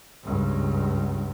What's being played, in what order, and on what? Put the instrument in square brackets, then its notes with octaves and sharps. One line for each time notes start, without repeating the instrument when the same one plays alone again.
[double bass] C#2 G2